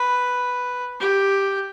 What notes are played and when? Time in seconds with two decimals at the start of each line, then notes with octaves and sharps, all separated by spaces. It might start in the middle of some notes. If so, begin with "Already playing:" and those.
Already playing: B4
1.00 G4